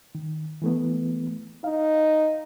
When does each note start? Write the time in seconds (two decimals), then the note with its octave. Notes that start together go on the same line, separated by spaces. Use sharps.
0.15 D#3
0.62 E3 A3 B3
1.64 D#4 F5